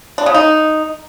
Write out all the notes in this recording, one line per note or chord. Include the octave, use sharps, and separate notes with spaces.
D4
C#3
D#4